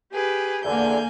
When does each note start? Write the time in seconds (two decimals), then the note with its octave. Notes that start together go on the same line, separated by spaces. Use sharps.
0.13 G4 G#4 B4
0.64 E2 D3 A#3 G#5 G6